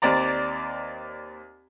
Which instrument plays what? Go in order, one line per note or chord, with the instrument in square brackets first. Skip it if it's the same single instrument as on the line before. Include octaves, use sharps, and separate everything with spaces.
[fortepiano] D#2 C4 D5 A#5